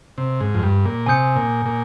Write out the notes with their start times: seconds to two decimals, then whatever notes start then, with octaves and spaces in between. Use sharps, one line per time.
0.18 C3
0.41 G#2
0.54 F2
0.63 G2
0.85 A#2
1.06 C3 G#5 D#6 G6 C#7
1.36 A#2
1.66 A#2